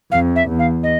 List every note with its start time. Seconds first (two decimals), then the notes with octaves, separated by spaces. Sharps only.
0.12 F2 F5
0.36 E5
0.48 E2
0.59 F5
0.83 D#5